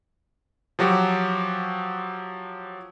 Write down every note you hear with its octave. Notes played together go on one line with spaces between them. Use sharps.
F3 F#3 F#4 G4